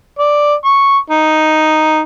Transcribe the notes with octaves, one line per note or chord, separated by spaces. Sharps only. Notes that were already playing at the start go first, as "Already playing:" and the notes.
D5
C#6
D#4